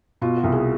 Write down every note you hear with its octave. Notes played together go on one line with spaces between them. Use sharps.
B2 F4
F#4
C2
G#4